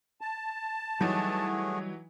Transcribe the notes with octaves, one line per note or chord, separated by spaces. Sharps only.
A5
E3 F#3 G3 A3 D#4 F#4 G#4